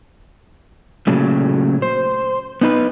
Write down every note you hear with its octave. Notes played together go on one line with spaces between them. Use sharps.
A#2 C#3 F#3 A3
C5
B3 D#4 B4